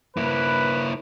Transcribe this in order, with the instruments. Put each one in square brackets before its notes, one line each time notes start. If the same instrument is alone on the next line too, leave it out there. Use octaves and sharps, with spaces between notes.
[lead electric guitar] A#3 E4 [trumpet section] B4